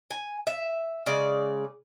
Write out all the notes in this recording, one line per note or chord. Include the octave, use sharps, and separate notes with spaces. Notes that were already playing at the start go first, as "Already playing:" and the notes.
G#5
E5
C#3 G#3 D5